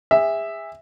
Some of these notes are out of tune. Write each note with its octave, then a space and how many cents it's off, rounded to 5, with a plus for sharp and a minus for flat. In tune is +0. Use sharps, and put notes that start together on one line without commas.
G#4 -35 E5 -5